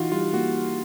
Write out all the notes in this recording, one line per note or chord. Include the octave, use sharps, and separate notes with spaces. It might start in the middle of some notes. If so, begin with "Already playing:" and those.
Already playing: E3 D#4 F4 F#4
G3 F4
A#3 F#4